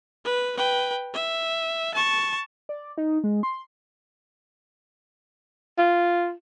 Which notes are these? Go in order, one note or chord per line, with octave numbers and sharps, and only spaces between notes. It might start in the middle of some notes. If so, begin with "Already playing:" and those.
B4
B4 G5
E5
A5 C#6
D5
D#4
G#3
C6
F4